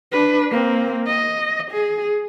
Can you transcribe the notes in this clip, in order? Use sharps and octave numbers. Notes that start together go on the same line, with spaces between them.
D4 B4
A#3 C4
D#5
G#4